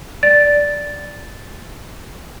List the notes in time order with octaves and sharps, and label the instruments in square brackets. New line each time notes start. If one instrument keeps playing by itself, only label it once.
[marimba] D5 [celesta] A6